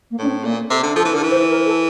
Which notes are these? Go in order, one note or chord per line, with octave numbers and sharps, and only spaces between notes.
A#3
A2 D4
C4
A#2 A#3
C3 A4
D3
F3 A4
E3
D3 A#4
E3
C5
A#4
A4